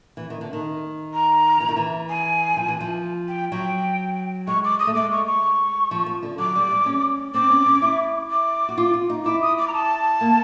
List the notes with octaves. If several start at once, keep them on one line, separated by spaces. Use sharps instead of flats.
E3
D#3
D3
D#3
A#5
E3
D#3
E3
G#5
F3
E3
F3
G5
F#3 G5
G#3 C#6
D6
D#6
A3
G#3 D6
C#6
C#6
F3
F3
D3
F#3 D6
G3
G3
C#4
C4 D6
C#4
C#4
E4
D6
F#4
F4
F4
D#4
E4 D6
D#6
D6
A#5
A5
A#3